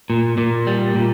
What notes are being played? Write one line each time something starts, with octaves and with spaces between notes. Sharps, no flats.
A#2
A#2
G3
A#2